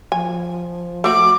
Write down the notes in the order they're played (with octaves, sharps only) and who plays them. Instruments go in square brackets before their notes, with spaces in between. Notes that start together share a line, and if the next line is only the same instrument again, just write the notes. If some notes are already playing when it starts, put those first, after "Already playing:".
[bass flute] F3 [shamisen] G#5
[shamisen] A3 F#4 [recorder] D6